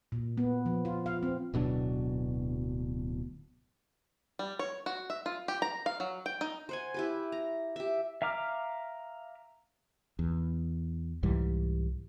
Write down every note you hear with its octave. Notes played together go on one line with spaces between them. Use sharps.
A#2
B3
F3
F4
F5
C4
D1 B2 F#3 D4
G3
C#5
F#4
E5
F4
G4
A#5
F5
F#3
G5
D#4
C5 F#5 G#5
E4 G4 B4
A#5
G4 E5
E5 F5 A#5 D6 F6
E2
C2 G#2 E3 G3